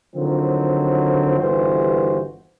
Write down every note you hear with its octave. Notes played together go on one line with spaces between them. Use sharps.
D3 D#3 F3 F#3 C4
G1 D#2 E3 F#4 C5